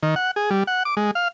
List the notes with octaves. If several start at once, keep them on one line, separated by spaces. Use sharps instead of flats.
D#3
F#5
G#4
G3
F#5
D6
G#3
F5